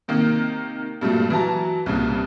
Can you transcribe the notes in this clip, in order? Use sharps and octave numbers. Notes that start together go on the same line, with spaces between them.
C3 D#3 A#3
G2 A#2 F#3 A3
E3 F#3 A5 A#5
C2 G2 A#2 C#3